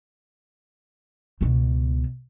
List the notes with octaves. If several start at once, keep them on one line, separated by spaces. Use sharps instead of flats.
C#2 B2